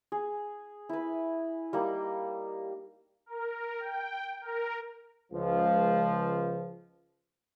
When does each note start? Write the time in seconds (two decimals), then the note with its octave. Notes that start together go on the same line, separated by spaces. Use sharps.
0.12 G#4
0.89 E4 B4
1.73 G3 A#3 D#4
3.26 A#4
3.80 G5
4.41 A#4
5.32 C#2 F3